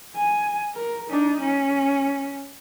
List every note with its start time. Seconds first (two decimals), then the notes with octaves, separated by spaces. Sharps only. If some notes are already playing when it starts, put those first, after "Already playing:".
0.16 G#5
0.75 A#4
1.10 D4 D#4
1.41 C#4